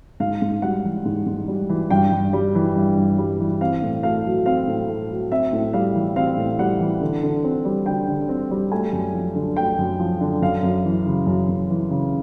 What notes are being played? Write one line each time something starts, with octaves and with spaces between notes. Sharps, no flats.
G#2 F5
G#2
G3 F#5
E3
G#2
G#2
G3
E3
G2 G5
G2
G3
E3
G2
G2
G3
E3
C4 F5
A2
A3 F5
F#3
C4 F5
A2
A3
F#3
C4 E5
A2
G3 F5
E3
C4 F5
A2
G3 F#5
E3
D3
D3
C4
G3
D3 G5
D3
C4
G3
A3 G#5
F#2
F3
D3
A3 G5
F#2
F3
D3
F#2 F5
F#2
E3
C#3
F#2
F#2
E3
C#3